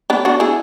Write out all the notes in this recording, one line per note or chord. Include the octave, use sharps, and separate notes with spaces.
B3 D4
D4 F#4
E4 G#4